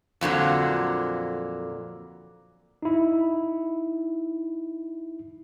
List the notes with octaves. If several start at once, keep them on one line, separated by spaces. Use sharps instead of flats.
F2 A#2 D3 F#3
D#4 E4